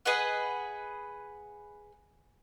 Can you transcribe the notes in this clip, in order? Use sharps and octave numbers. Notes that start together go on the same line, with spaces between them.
G#4 B4 D#5 F#5